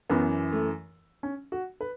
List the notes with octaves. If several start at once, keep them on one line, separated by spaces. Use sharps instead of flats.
F#2 E3 B3
A3
C#4
F#4
B4